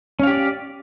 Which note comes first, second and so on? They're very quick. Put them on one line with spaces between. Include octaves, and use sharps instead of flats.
C#4 F5 G4 D5